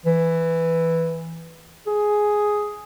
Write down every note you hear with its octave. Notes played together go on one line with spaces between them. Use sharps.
E3
G#4